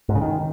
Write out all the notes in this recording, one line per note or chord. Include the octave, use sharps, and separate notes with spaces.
G#2
C#3
D#3